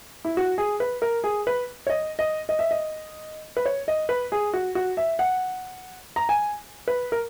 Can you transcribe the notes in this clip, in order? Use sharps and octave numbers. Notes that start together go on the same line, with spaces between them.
E4
F#4
G#4
B4
A#4
G#4
B4
C#5
D#5
D#5
D#5
E5
D#5
B4
C#5
D#5
B4
G#4
F#4
F#4
E5
F#5
A#5
G#5
B4
A#4